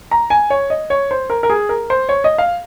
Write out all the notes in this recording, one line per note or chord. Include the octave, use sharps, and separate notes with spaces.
A#5
G#5
C#5
D#5
C#5
C5
A#4
A#4
G#4
A#4
C5
C#5
D#5
F5